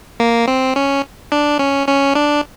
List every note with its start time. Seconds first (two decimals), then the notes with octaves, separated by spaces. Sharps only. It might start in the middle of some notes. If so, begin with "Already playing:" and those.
0.20 A#3
0.48 C4
0.76 C#4
1.32 D4
1.59 C#4
1.88 C#4
2.15 D4